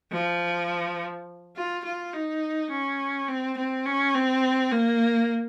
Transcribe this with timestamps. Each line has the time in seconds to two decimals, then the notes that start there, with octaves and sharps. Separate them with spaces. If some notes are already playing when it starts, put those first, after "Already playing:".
0.12 F3
1.56 F4
1.85 F4
2.13 D#4
2.71 C#4
3.29 C4
3.57 C4
3.86 C#4
4.14 C4
4.72 A#3